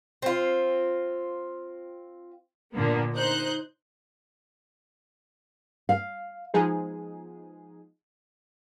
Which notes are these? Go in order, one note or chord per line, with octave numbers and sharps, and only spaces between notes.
C4 F4
A#2 D3 A#3 B3
D#4 C5 F#6 G6
F5
F3 G#3 B3 D#4 G#4